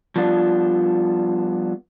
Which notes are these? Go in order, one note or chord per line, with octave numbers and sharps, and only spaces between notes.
F3 G3 B3 D4 F4